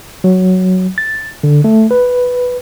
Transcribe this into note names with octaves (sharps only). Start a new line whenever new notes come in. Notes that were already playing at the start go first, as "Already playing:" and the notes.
F#3
A6
D3
A3
B4